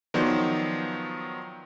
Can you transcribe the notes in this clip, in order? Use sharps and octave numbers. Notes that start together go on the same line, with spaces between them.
D#3 F3 F#3 B3 C5 D5